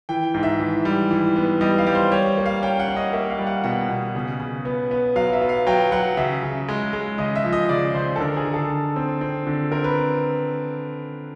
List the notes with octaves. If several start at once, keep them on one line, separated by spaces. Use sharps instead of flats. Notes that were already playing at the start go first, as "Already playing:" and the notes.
E3 G5
G#2
E5
E3
G3
E3
B3
G3 D#5
F5
G3
C5
G3 C#5
A#3
F5
C#4 G5
F#5
C#4
D#5
A#3 E5
F5
G3
F#5
B2 F#5
B2
C#3
C#3
B3
B3
F#3 F5
E5
B3
F5
F#3 G5
F#3 F#5
C#3 E5
C#3
G#3
G#3
C#3 D#5
E5
F3
D#5
C#3 D5
C#3 C5
A4
D3 A#4
G#4
D3
A4
D3
C4
C4
D3
C4 A#4
B4